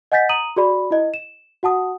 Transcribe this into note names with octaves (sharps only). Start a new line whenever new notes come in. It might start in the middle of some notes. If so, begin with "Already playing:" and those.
D#5 F#5 G#5 G6 A6 B6
A#5 D#6 D#7 F#7
F#4 G#4 D5 B5
E4 D#5
E7
F#4 F#5 A5 D#6